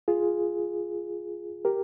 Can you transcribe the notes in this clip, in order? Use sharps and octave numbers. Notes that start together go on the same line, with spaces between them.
F4 G#4
G4 A#4